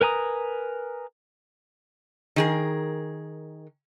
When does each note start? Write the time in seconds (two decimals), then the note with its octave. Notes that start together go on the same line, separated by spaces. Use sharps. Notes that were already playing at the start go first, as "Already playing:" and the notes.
0.01 A#4 B4 G#5 A#5 D#6
2.36 D#3 G#4 A#4